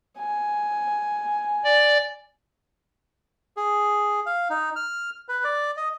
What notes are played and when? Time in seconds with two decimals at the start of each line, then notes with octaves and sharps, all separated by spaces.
0.18 G#5
1.64 D5
3.57 G#4
4.26 F5
4.50 D#4
4.76 F6
5.28 B4
5.44 D5
5.77 D#5